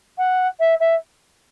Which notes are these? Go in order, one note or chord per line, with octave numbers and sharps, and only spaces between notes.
F#5
E5
E5